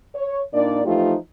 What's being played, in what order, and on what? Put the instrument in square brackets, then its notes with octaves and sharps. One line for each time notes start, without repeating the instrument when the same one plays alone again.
[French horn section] C#5
A#2 A#3 D4 D#4 D5
E3 F3 A3 D#4 F4 G4